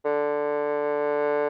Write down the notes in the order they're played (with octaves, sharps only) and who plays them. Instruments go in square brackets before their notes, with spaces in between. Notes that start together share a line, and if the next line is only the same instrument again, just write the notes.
[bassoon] D3